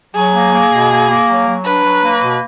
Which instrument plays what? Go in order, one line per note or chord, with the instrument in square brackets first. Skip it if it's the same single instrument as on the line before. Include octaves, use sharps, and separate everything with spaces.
[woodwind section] F#3 [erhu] G#4
[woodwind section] A#3
A#3
B2
A#3
A#3
F#3
F#3
[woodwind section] D4 [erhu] B4
[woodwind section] F#3
A#3
B2